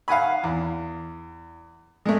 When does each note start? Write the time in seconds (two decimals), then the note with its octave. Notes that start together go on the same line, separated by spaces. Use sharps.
0.08 F5 F#5 G#5 B5
0.44 E2
2.06 G#3 A3